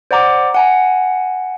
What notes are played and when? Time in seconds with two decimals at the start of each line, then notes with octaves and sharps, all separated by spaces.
0.11 C5 D5 F#5 A#5 D6
0.54 F#5 G#5 A#5